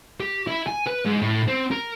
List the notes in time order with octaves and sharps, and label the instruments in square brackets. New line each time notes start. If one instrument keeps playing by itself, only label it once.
[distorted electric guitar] G4
E4
G#5
B4
G#2
A2
C4
A#4